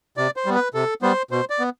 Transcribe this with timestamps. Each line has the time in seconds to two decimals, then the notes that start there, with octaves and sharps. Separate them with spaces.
0.17 C3 D5
0.36 C5
0.46 G3 B3
0.55 B4
0.74 C3 A4
1.02 G3 B3 C5
1.31 B2 C5
1.50 D5
1.60 B3